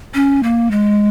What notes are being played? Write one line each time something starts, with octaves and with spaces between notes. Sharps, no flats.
C#4
A#3
G#3